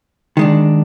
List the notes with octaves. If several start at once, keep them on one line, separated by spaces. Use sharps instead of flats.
D#3 G#3 D4